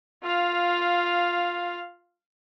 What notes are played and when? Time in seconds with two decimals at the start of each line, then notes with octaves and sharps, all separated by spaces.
0.24 F4 F5